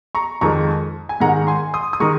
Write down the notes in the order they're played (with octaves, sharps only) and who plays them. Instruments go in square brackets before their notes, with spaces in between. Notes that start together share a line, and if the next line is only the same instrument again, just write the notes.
[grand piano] A#5 C#6
F2 D#3 G#3 A#5 C#6
G#5
G#2 D#3 G#3 F#5 A#5
G#5 C6
C6 D#6
D#6
D#3 G#3 A#5 C#6